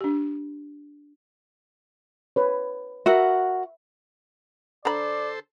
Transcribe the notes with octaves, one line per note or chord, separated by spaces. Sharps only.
D4 G4
B4 C#5
F#4 A#4 E5 F#5
D3 A4 C5 D5 A#5 B5